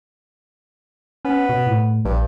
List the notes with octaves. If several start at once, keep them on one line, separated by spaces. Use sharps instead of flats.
B3 C#4
B2
A2
A#1 G2